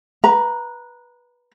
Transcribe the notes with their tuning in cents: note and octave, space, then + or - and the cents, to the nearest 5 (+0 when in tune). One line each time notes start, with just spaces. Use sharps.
B4 -15 A#5 +0